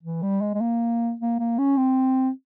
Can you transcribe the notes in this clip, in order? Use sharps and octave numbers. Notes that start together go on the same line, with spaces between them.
E3
G3
G#3
G#3
A#3
A#3
A#3
C#4
C4